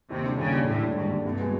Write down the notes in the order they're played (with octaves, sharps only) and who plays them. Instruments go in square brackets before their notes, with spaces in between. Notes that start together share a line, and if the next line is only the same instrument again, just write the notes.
[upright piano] D#2 [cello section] C3
[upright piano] D3 G3
[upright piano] D#2 [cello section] C#3
[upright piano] D3 G3
[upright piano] D#2 [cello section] A2
[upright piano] D3 G3
[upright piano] D#2 [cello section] G#2
[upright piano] D3 G3
[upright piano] C2 [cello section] G2
[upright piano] B2 G#3 B3